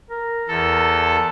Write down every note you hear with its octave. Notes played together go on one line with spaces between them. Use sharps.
A#4
E2 A4